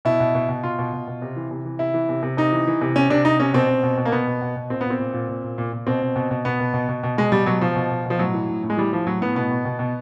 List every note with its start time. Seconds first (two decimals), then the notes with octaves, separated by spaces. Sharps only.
0.05 B2 E4
0.20 B2
0.35 B2
0.49 B2
0.63 B2 F4
0.79 B2
0.93 B2
1.07 B2
1.22 C3
1.36 E3
1.51 C3
1.65 E3
1.79 C3 E4
1.94 E3
2.09 C3
2.23 C3
2.37 C3 D#4
2.52 E3
2.67 E3
2.81 C3
2.96 C3 C#4
3.10 C3 D4
3.25 C3 D#4
3.40 C3 C#4
3.54 B2 C4
3.68 B2
3.83 B2
3.98 B2
4.05 A#3
4.12 B2 B3
4.27 B2
4.42 B2
4.56 B2
4.70 A#2 C4
4.81 A#2 B3
4.90 C4
4.99 A#2
5.14 A#2
5.29 A#2
5.44 A#2
5.58 A#2
5.73 A#2
5.87 B2 C4
6.01 B2
6.16 B2
6.31 B2
6.45 B2 B3
6.60 B2
6.74 B2
6.89 B2
7.03 B2
7.17 B2 G#3
7.32 B2 G3
7.46 B2 F#3
7.61 B2 F3
7.76 B2
7.91 B2
8.05 B2
8.10 F3
8.19 A2 F#3
8.34 E3
8.49 A2
8.63 A2
8.70 G#3
8.77 E3 G3
8.92 E3 F3
9.06 A2 F#3
9.21 A2 B3
9.36 B2 B3
9.51 B2
9.65 B2
9.79 B2